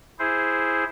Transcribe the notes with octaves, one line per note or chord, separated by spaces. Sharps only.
E4 G#4 C5